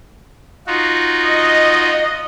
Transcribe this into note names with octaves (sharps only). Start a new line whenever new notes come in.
D#4 F4 F#4
D#5